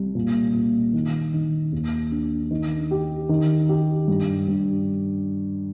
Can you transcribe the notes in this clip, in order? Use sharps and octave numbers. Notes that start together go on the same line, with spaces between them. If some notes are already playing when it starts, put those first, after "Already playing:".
Already playing: C2
A#2
A#2
D#3
D#3
D#2
D4
D#3
G4
D#3
G4
G2
G2